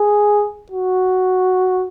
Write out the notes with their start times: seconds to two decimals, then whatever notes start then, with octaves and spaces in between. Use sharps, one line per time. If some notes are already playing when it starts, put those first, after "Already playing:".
Already playing: G#4
0.72 F#4